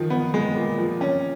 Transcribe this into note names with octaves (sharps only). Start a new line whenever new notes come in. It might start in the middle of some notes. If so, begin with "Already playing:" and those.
Already playing: D#3 F3
B3
G#3
A#2
F3
C#4